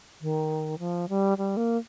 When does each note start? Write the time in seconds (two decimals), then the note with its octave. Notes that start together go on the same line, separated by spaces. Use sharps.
0.21 D#3
0.79 F3
1.09 G3
1.38 G3
1.57 A#3